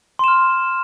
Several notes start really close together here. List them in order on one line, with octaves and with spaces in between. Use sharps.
C6 E7 F6